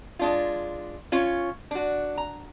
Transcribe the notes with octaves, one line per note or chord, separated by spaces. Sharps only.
G#3 D4 F4
C#4 F4 C#5
D4 F#4
A#5